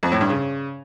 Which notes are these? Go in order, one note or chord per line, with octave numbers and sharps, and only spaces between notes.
F2
A2
G2
C#3